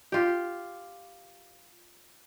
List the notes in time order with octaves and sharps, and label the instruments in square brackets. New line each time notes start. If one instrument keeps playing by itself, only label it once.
[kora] F4 G4